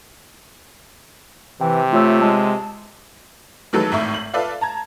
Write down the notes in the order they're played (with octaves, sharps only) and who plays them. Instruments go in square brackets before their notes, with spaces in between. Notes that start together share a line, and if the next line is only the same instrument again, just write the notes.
[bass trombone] C3 [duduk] E3 [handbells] G5
[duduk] A3 [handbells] F4 C#5 E6
[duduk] G#3 [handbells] A5
[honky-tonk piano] D#3 E3 F#3 G#3 A4 B4
G#1 A2 D#3 E4 E5 C#6
F#7
F4 A4 B4 D5 E5 F5
A5 A#5 G#6